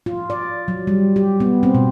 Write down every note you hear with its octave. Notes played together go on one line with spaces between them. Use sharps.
F4
D5
F#3
G3
G4
B3
C4
B2